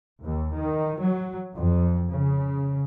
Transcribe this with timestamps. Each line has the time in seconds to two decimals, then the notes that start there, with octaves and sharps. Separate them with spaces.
0.23 D#2
0.55 D#3
1.00 F#3
1.54 F2
2.11 C#3